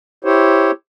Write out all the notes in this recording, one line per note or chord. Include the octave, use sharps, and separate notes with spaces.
E4 G4 C5 C#5